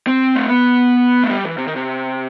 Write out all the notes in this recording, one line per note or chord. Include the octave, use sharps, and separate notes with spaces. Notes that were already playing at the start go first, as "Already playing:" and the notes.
C4
A3
B3
A3
G3
E3
C3
D#3
C3